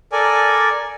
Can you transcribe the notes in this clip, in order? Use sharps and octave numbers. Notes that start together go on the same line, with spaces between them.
A4 A#4 D5 G#5